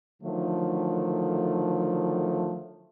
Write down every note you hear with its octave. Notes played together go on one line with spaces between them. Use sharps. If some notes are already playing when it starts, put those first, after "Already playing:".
D3 D#3 F3 F#3 A3